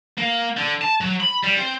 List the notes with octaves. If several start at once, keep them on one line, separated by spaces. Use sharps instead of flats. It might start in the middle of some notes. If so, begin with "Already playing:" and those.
A#3
D3
A5
F#3
B5
G3
C4